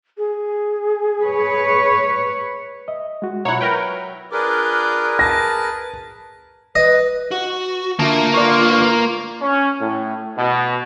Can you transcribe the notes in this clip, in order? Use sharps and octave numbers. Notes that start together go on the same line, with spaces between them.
G#4
B4 C#5
D#5 E5
G#3 F#4
B2 F#3 E4 F4 C#5 F#5
A#4 B4 C#5 G5
D4 F4 G#4 A#4 B4 D5
A5 A#6
B4 D#5
F#4
D3 A#3 F4 A#4 E5 A5
D3 F4 B4 D5 C#6
C#4
A2
B2